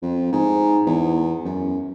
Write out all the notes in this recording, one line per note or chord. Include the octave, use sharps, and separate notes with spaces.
F2
G#2
E2
F#2